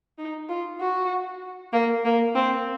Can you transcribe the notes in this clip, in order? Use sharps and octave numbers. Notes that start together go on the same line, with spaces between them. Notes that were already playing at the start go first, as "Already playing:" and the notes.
D#4
F4
F#4
A#3
A#3
C4